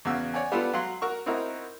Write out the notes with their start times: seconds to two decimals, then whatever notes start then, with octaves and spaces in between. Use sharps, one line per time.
0.05 E2 C#3 F#4 E6
0.34 C#5 D5 F#5 G#5
0.52 G3 B3 D4 F4 A4
0.73 F#3 F5 F#5 C6
1.01 F#4 A#4 C#6 E6
1.26 C4 D#4 E4 F#4 A#4